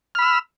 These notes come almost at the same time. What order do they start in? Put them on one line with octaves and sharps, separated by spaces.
F6 B5 E6